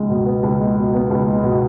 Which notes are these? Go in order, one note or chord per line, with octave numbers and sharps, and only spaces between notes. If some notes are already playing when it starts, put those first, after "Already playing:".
Already playing: C#2 G#3
B2
B3
C#2
G#3
B2
B3
C#2
G#3
B2